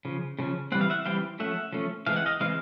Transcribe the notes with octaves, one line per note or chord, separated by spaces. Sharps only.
C#3 F3
C#3 F3 C#4
E3 G3 C4 F#5
F5
E5 F#5
E3 G3 C4 F5 G5
F3 A3 C#4 E5 F#5
F3 A3 C#4
E3 G#3 C4 F5
F#5
D#5 F5
E3 G#3 C4 F5